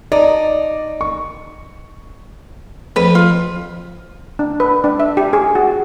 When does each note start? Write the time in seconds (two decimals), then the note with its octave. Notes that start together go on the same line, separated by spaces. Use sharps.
0.12 D#4 D5
1.01 C#6
2.96 F2 B4
3.15 F4
4.39 D4
4.60 B4
4.84 D4
5.00 E5
5.17 G4
5.33 G#4
5.55 F#4